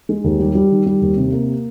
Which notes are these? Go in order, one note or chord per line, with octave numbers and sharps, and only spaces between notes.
G#3
D#2
G3
G3
D#3
G3
D#2
C3
A#3